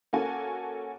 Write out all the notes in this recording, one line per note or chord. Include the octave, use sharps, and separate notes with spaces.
A#3 C#4 F#4 A4 G#5